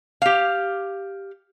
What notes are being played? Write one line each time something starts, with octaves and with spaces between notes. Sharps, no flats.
G4 F5